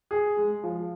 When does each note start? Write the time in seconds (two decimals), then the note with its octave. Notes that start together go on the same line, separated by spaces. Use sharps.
0.11 G#4
0.37 G#3
0.63 F3